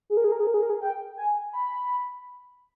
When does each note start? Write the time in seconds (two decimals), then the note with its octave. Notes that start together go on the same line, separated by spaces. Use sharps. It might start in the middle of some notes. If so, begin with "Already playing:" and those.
0.10 G#4
0.17 A#4
0.24 G#4
0.32 A#4
0.40 G#4
0.47 A#4
0.54 G#4
0.63 A#4
0.70 G#4
0.81 G5
1.17 G#5
1.53 B5